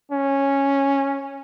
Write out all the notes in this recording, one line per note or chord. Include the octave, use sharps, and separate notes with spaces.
C#4